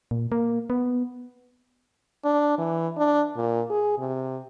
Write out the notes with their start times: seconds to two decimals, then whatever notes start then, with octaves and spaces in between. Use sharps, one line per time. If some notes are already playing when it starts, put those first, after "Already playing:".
0.11 A#2
0.32 A#3
0.70 B3
2.24 D4
2.58 E3
2.97 D4
3.37 A#2
3.70 G#4
3.98 C3